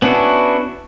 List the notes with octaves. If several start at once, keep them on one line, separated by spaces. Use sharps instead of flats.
B3 C#4 D4 E4 F#4